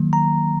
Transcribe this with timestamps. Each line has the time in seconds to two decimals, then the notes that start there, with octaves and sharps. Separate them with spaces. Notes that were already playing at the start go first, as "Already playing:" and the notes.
Already playing: D#3 F#3 A#3
0.13 A#5